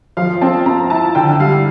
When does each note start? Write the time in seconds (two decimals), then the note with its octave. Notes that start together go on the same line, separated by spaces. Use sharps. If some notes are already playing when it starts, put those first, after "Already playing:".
0.17 F3 F5
0.41 C4 A5
0.66 C4 A#5
0.90 E4 A5
1.15 D3 G5
1.40 G3 F5